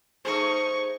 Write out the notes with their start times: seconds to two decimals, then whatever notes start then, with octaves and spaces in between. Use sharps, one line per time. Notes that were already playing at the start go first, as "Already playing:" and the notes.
0.25 A3 D#4 G#4 C5 C#6